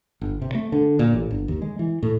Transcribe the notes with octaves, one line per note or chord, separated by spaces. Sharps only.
G1
C3
A3
D3
A#2
A1
G1
D#2
G#3
E3
A2